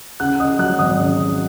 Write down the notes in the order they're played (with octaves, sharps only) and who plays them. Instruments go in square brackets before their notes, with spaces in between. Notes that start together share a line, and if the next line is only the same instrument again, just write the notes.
[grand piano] C#3 F#5 F#6
C#3 D#5 D#6
F#3 F#5 F#6
G#1 D#5 D#6
C#3
F#3